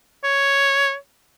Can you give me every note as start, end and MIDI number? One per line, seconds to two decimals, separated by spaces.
0.24 0.95 73